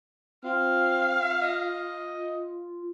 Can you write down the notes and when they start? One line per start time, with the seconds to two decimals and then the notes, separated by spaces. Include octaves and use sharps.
0.44 C4 F4 F5
1.42 D#5